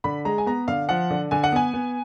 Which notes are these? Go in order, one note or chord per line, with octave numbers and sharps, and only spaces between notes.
D3 B5
G#3 A#5
G#5
B3 A#5
D3 F5
F3 F#5
D3
D3 G#5
F#5
B3 G#5
B3